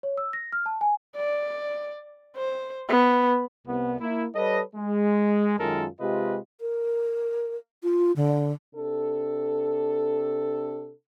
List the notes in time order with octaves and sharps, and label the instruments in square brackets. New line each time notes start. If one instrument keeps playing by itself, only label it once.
[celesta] C#5
E6
A#6
F6
A5
G#5
[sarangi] D5
C5
B3
[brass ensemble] C2 B3
A#3 E4
G3 A4 B4 C#5 D#5
G#3
F#2 D#3 G#3 F4 A4 A#4
C3 G#3 F4 G4 B4 D#5
[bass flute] A#4
F4
D3
[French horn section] C3 D4 A4